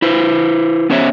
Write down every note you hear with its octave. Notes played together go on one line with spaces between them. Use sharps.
E4 B4 C5
B3 C#4 C5 C#5 E5